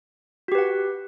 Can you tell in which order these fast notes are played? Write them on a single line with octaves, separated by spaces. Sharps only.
F#4 G4 B4 F#5